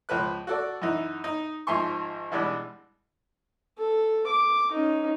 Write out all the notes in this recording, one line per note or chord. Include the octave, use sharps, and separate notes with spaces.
C#2 F3 B4 F#6
F#4 A4 D5
F#2 E3 D#4
D#4
G#1 F3 E5 G#5 C6 C#6
B2 E3 G3 G#3 D4
A4
D6
C#4 D#4